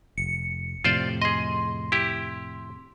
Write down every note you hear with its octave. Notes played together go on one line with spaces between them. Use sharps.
F1 C#7
F2 A2 C3 F4 C5 D5
G#4 D#5 C6
E4 G4